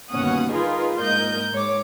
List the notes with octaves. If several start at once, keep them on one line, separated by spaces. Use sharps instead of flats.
G1 D#2 B2 C#4 F#5 D#6
D#4 F4 G#4 A#4 B4
G#2 A#3 A#4 D#5 G6
G#2 C#5 D6